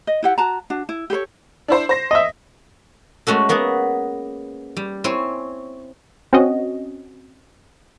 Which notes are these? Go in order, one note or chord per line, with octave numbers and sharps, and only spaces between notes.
D#5
E4 G4 F#5
F#4 A5 A#5
D4 F#4
E4
G4 A4 C5 C#5
D4 E4 C5
C5 A#6
D#5 E5
G#3 A3 C#4 F#4 A4
A#3 B3 F#4 G#4
G3
C4 E4 C#5 G#5
C4 C#4 F#4 D#5